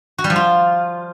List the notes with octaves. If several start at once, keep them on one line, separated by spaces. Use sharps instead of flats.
F#4
G3
F3
F4